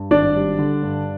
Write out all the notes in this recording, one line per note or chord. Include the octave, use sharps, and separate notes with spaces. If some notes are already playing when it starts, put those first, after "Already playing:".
Already playing: G2
G#1 D4 D5
G3
D3
G2